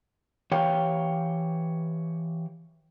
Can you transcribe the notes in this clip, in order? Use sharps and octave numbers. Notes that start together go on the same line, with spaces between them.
E3 G4 C#5 F5 G5